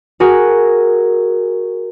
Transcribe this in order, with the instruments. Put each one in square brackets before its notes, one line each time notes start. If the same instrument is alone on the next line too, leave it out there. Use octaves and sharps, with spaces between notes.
[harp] F#4 G#4 A#4